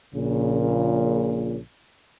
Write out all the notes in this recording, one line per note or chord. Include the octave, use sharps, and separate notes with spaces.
A#1 A#2 C#3